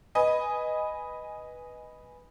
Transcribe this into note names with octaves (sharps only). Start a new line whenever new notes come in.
B4 D#5 G#5